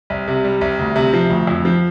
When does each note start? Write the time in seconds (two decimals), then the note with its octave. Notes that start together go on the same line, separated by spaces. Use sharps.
0.10 C2
0.28 C3
0.44 G3
0.61 C2
0.79 D2
0.96 C3
1.13 F3
1.30 D2
1.47 F2
1.65 F3